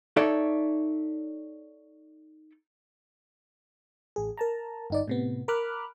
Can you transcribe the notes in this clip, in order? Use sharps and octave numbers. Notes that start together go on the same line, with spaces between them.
D#4 A4 C#5 D5 E5
A1 G#4
A#4 A5 A#5
G1 D#4 D5
A2 C3 B3
A#4 B5 D6 F6 F#6